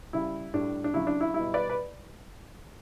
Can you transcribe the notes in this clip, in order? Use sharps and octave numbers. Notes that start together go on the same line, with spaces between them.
C#3 G3 E4
A2 G3 D4
D4
C#3 F#3 E4
D4
E4
B2 G3 E4
B4 D5
B4